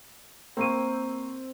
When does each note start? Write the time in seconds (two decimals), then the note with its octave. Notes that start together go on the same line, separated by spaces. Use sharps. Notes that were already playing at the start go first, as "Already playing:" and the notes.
0.57 A#3 C4 A#4 C#6 D#7